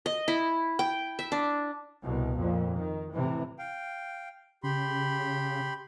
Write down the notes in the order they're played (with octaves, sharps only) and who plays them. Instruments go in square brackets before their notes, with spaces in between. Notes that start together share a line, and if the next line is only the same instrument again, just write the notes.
[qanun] D#5
E4
G5
E5
D4
[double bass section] C2 B2
F2 A#2
D#3
A2 C3 E3
[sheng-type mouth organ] F5 G5
[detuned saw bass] C#3 [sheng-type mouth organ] G4 B5 C6